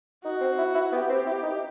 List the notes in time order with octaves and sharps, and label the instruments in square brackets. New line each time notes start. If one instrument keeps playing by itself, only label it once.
[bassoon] D#4 [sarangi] F#4
[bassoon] C4
E4
E4
[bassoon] B3 [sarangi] G4
[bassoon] C4
E4
D#4